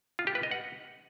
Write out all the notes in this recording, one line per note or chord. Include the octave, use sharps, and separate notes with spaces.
F4
G4
B4
D#5
F#5